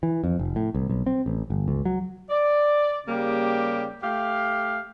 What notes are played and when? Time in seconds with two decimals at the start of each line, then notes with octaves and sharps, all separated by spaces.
0.03 E3
0.24 F2
0.39 F1
0.56 A2
0.74 C2
0.89 B1
1.06 C4
1.26 A1
1.50 G1
1.68 C#2
1.85 F#3
2.29 D5
3.07 C#3 G3 A#3 G4
4.02 A3 G4 F5